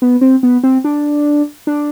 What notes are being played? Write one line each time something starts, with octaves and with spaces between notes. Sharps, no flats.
B3
C4
B3
C4
D4
D4